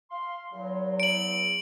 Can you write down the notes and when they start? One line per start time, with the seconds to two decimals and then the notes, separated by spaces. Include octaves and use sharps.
0.10 F5 C6
0.52 E2 F#3
1.00 D7 F#7